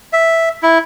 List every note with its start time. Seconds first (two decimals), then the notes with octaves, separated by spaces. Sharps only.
0.13 E5
0.63 E4